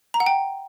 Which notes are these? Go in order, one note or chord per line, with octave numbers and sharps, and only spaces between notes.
A#5
F#5
G5